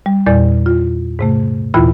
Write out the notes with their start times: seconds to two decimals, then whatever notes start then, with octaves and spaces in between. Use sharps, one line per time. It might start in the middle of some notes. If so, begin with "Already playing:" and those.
0.06 G3
0.27 E2 A#2 G3 D5 A6
0.66 F4
1.19 G#2 C3 A3
1.74 D#2 A#2 E3 E4 F4 B5